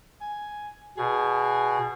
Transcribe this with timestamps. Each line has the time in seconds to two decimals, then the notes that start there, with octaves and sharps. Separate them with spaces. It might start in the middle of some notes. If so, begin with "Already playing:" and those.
0.21 G#5
0.98 B2 G#4